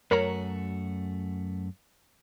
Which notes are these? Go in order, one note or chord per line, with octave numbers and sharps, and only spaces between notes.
F#2 A3 F#4 A#4 C#5 A#5